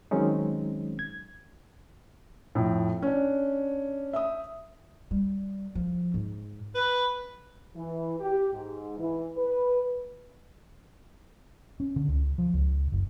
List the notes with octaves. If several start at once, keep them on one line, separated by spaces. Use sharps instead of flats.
D#3 F#3 G#3 C4 C#4 D#4
G#6
F2 A2
C#4 D4
E5 D#6
G3
F3
G#2
B4
E3
G4
G#2
E3
B4
C#4
D3
C#2
F3
C#2
F#1